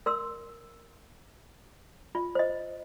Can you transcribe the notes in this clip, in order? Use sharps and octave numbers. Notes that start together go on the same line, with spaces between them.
A#4 C6 E6
F4
C5 D#5